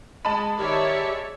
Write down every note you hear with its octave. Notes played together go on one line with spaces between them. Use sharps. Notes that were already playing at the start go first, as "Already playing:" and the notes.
G#3 D#5 A5 B5
D#3 G4 C#5 D5 E5
G#3